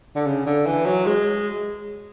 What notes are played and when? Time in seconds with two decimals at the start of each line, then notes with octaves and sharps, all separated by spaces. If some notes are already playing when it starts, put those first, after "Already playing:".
0.16 D3
0.26 C#3
0.46 D3
0.66 E3
0.86 F#3
1.06 G#3